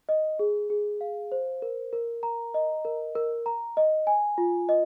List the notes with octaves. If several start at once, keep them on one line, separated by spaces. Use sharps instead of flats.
D#5
G#4
G#4
F5
C5
A#4
A#4
A#5
D#5
A#4
A#4
A#5
D#5
G#5
F4
D#5